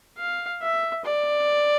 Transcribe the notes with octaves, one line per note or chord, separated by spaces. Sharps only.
F5
E5
D5